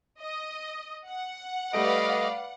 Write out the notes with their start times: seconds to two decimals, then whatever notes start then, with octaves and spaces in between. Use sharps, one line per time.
0.20 D#5
1.08 F#5
1.73 G3 A3 B4 D5 D#5 F5 D7